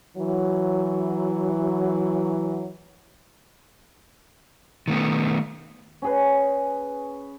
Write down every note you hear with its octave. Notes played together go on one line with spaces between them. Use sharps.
E3 F#3
D#3 A3 B3
C#4 G#4 B4